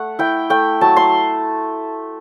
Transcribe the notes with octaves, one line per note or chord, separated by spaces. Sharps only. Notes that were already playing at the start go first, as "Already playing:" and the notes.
Already playing: A3 F#5
E4 G5
A3 G5
F#3 A5
C6